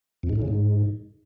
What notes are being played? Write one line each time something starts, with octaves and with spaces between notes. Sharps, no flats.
F2
G#2
A2
C#3
G#2